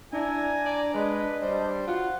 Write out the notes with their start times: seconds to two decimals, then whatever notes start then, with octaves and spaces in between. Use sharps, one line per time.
0.13 D4 E4 G#5 A#5
0.66 D5
0.94 G#3 B4 D#5
1.42 G3 C5
1.87 F4 F#4 F#5